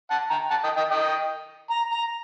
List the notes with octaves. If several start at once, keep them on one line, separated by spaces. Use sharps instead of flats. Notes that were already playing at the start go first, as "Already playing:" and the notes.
F#5 A5
G5 A#5
F#5 A5
D#5 G5
D#5 G5
D#5 G5
A#5
A#5